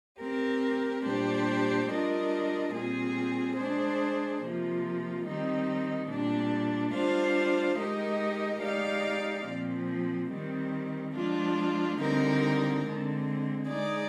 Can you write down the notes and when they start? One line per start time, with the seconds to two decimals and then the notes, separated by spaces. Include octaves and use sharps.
0.19 C4 G4 A#4
1.04 A#2 G3 D4 G4 C5
1.88 G3 D4 F4 A#4 D#5
2.72 A#2 G3 C4 F4 G#4
3.56 G#3 D4 G#4 C5
4.41 C3 F3 A#3 F4
5.24 D#3 G3 C4 D#4
6.09 A#2 G3 D4
6.92 G3 D4 F4 C5 F5
7.77 G#3 D#4 G4 A#4 D#5
8.61 G#3 D#4 G4 D5 F5
9.46 A#2 F3 C4
10.30 D#3 G3 C4
11.14 F3 G#3 D4 F4
11.98 D3 G3 C4 D#4 A#4
12.82 D3 G#3 C4
13.67 G#3 D#4 G#4 D5